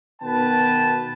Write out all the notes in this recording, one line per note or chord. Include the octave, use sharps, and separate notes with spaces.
B2 D#3 B3 B4 G5 A5